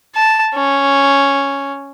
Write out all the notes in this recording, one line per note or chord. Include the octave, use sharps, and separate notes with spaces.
A5
C#4